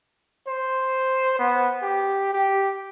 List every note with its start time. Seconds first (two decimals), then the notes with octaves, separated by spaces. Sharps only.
0.48 C5
1.39 B3
1.83 G4
2.33 G4